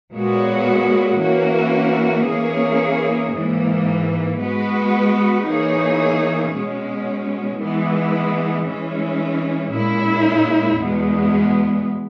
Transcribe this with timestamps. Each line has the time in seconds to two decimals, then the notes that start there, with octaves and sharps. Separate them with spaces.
0.12 A#2 G#3 B3 F#4 C#5
1.19 E3 A#3 C#4 F#4
2.26 E3 A#3 C#4 G#4 C#5
3.33 G#2 E3 A#3
4.39 G#3 B3 F#4 B4
5.46 E3 A#3 D#4 G#4 C#5
6.53 B2 G#3 C#4
7.59 E3 G#3 B3
8.66 E3 G#3 C#4
9.72 A#2 G#3 C#4 E4
10.80 E2 B2 G#3 B3